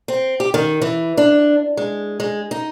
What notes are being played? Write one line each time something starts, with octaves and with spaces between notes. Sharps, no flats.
C4
G4
D#3
E3
D4
G#3
G#3
D#4